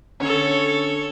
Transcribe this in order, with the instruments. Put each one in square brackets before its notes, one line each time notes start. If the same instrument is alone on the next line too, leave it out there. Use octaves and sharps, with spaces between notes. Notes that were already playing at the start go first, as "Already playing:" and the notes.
[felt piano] D3 C#4 [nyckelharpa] A4 C#5